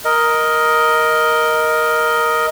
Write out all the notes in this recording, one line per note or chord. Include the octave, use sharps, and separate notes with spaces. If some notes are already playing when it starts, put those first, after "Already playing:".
A#4 D#5